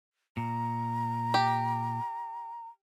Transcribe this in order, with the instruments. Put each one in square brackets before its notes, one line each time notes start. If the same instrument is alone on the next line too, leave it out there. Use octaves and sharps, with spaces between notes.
[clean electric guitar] A#2 [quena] A#5
[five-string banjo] G4